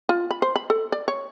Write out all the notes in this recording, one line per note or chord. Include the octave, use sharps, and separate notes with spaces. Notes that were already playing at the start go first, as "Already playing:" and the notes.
F4
B5
C5
B5
A4
D5
C#5